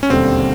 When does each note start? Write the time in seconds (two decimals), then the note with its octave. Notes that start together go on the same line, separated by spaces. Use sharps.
0.03 C#4
0.09 E1 D#2 D3 G3 C4